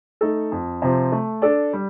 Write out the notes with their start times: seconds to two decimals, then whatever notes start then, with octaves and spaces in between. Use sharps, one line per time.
0.21 A3 D#4 A4
0.52 F2
0.82 C3 F3 C4
1.12 A3
1.42 D4 A4 D5
1.73 G3